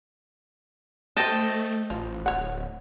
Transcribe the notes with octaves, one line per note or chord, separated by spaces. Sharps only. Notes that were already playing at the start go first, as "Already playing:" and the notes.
A3 B4 C5 D#5 G5 A5
A1 F3
D1 C#5 F#5